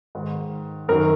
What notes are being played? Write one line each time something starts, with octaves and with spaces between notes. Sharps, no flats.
G#2 D#3
F#2 D#3 A#4